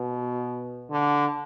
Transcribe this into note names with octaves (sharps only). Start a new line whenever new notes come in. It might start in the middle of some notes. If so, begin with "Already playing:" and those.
Already playing: B2
D3